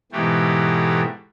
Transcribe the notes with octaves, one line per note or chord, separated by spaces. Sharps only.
G#2 B2 E3 A3 G4